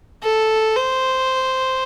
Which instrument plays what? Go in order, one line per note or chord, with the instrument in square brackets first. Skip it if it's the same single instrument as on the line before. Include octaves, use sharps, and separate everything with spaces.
[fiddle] A4
C5